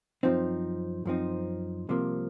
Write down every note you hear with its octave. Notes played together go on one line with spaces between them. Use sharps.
F#2 F3 C4 D#4
F#2 F3 C4 D#4
C2 C3 F3 A#3